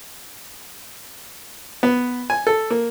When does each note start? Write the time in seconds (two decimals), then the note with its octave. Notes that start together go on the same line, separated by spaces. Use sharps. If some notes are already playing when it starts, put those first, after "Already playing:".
1.83 B3
2.30 G#5
2.47 A4
2.70 A#3